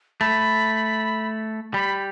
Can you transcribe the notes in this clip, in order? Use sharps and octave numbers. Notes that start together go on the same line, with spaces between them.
A3 B5
G3 B5